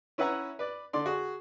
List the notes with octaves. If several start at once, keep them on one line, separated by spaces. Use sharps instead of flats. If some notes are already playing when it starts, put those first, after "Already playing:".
C#4 E4 B4 E5 F#5 A#5
B4 D5
D3 D5 C6
F#4 G#4